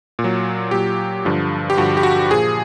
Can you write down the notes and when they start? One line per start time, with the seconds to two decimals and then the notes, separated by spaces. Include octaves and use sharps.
0.19 A#2
0.24 F#3
0.71 A#2 F#3 G4
1.25 G2 D3 F3
1.70 G4
1.77 G2 D3 F3 F#4
1.97 G4
2.03 F#4
2.30 A#2 F3 G#4